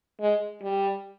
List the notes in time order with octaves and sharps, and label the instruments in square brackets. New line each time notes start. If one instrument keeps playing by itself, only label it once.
[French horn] G#3
G3